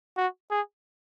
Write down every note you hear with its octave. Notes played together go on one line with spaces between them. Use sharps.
F#4
G#4